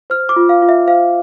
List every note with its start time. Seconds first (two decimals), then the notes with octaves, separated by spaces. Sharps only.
0.10 C5 F6
0.29 D6
0.36 F4
0.49 F5
0.62 F4
0.69 E5
0.87 C5 F5